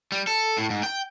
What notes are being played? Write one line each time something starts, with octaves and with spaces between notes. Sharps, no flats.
G3
A4
A2
G#2
G5